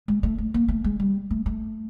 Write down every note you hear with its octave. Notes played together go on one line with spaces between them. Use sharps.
G#3
A3
A3
A#3
A3
G#3
G3
A3
A3